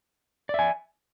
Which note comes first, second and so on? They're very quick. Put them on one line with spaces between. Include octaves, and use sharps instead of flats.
D5 E5 G#5